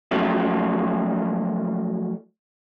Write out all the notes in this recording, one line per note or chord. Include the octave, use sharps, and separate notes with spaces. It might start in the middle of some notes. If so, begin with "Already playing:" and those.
F3 F#3 A3 A#3 C#4 E4